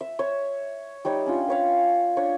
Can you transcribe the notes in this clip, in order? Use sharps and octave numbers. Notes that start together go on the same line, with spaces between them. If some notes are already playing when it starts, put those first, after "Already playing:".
E5
C#5
G3 D#4 C#5
C#4 D4 F4
B4 C#5 F5
D4 C#5